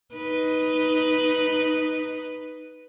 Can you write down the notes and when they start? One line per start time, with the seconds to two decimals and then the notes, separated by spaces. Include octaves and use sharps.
0.15 D#4 B4